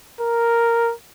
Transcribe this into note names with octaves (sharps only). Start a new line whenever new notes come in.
A#4